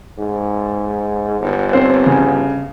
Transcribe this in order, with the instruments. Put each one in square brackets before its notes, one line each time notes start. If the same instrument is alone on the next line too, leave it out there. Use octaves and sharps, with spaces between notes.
[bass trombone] G#2
G1
[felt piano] C4 C5 C#5
C#3